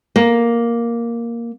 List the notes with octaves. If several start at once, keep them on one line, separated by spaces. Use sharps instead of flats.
A#3